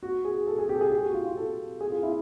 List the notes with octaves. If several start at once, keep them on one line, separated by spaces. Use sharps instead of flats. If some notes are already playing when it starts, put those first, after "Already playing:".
F#4
G#4
A4
G#4
G4
A4
G#4
G4
F#4
F4
F4
A4
G#4
F4
E4